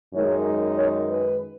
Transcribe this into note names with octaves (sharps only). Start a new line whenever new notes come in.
F#2 D#3 G#3 D#4 C#5
C#5
B4